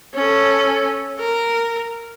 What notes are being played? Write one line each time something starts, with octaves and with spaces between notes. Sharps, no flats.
C#4 A4
A#4